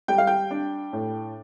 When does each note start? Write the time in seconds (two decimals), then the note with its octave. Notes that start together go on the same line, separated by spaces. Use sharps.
0.08 G3 G5
0.18 F5
0.27 G5
0.51 D4
0.93 A2